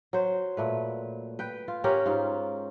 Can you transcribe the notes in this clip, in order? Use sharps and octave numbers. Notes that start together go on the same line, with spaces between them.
F#3 C5
A#2 A3 B4
B4 G5
F4
C#4 G4 A#4 F#5
G#2 F4